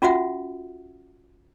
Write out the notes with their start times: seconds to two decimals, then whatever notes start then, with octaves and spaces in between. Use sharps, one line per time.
0.02 C#4 F4 F#4 E5 F#5